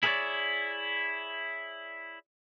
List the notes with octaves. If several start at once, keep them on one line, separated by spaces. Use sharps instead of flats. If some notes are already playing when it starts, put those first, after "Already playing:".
E4 G#4 A#4 B4 C#5 D5